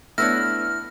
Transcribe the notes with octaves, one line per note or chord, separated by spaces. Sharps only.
A3 B3 D4 E4 B4 C#5 F6 A#6